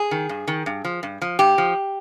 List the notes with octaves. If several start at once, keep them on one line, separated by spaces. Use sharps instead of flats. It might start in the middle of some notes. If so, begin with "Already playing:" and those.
Already playing: G#4
D#3
G2
D#3
G2
F3
G2
F3
G2 G4
F3